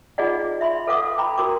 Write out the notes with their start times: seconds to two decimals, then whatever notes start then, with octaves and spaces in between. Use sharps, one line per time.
0.18 D#4 F4 G#4 D5 D#5 F#5
0.61 E5 B5 C6
0.87 A4 B4 F5 F#5 D6 D#6
1.18 G5 A#5 B5
1.38 F#4 A#4 C6 D6